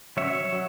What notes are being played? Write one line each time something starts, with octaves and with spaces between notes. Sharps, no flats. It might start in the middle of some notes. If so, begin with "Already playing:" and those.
F#3 C#4 C#5 E5
F#3